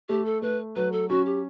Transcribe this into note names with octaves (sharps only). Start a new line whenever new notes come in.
A3 G4
A4
A3 B4
F#3 B4
A4
C#4 F#4
G4